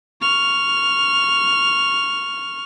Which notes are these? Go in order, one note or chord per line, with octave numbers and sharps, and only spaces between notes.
C#6 F6